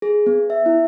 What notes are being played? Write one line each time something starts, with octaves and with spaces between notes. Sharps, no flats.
G#4
B3
E5
E4